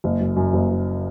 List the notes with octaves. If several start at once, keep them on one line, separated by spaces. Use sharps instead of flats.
F#1
F#2
F#2
F#1
F#2